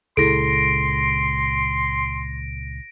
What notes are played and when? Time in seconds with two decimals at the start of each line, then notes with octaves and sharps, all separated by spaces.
0.17 C#2 A#2 E4 G#4 A4 C6 A#6 D7